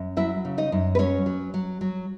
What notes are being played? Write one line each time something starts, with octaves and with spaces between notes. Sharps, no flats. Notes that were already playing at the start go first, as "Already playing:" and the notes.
Already playing: F#2
F#3 E4 E5
C#3
D#4 D#5
F#2
B4
F#3 C#4 C#5
F#3
F#3
F#3